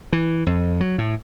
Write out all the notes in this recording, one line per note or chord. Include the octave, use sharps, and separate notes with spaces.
E3
F2
F#3
A2